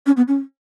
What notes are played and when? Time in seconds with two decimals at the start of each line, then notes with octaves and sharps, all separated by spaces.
0.06 C#4
0.17 B3
0.28 C#4